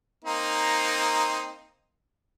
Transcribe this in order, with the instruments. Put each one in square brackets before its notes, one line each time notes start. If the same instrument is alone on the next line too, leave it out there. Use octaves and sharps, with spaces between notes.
[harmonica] A#3 C4 D#4